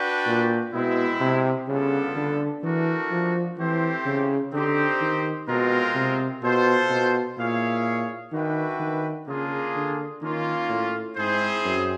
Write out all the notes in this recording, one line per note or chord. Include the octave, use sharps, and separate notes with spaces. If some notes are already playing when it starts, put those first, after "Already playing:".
Already playing: D4 F#4 B4 D5 G5
A#2
B2 G#3 C4 E4
C3
C#3 G3 B3 D4 F4 A4
D3
E3 A3 D4 F#4 A#4 D5
F3
E3 A3 C4 E4 G4 C5
C#3
D3 C4 D#4 G4 C5
D#3
B2 G#3 C4 F4 A#4
C3
B2 F4 A4 C5
B2
A#2 E4 G#4 C#5 F5
D#3 D4 F#4 B4 E5 G5
D#3
C#3 A#3 D4 F4 G#4
D3
D#3 A#3 C#4 F4
A2
G#2 C4 E4 G#4 C5
F#2